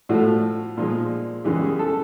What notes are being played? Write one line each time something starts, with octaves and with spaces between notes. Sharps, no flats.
A2 F3 A3 F#4
A#2 F3 G#3
F#2 C#3 E3 G#3 G4
G#4
A4